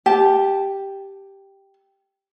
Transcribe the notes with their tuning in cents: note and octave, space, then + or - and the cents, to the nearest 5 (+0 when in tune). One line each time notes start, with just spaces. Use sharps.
G4 +0 A5 -20